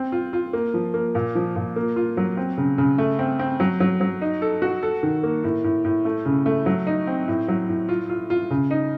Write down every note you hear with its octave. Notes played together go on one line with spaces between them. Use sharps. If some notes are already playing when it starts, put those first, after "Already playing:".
Already playing: C4
F4
F4
A#3
F3
A#3
A#2
F3
A#2
A#3
F4
F#3
C4
C#3
C#3
A3
C4
C4
F#3
F#3
F#3
D#4
A4
F#4
A4
D#3
A#3
A2
A2
A2
A3
C#3
A3
F#3
D#4
C4
A2
F#3
A2
F4
F4
F4
C#3
D#4